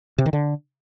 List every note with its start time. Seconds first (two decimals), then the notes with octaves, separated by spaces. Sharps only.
0.18 C3
0.26 D#3
0.33 D3